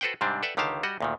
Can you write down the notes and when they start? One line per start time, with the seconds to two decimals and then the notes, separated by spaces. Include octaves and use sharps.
0.01 F#4 A4 B4 C5 F#5 G5
0.21 G#2 C3 G3 C4 D4
0.43 A4 B4 D5 E5 F#5 G5
0.57 C#2 D3 D#3 G4 F5 A5
0.83 G3 F#4 D#5 F#5
1.01 D2 A#2 D#3